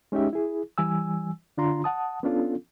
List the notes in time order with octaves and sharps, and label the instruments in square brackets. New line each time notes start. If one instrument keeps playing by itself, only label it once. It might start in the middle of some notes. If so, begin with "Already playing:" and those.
[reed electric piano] G#3 C#4 D#4 G4 E5
E4 G#4
E3 G3 G#5 E6
D3 D4 F4 A#5 C6
F#5 A5 D#6
B3 C#4 D4 F4 A4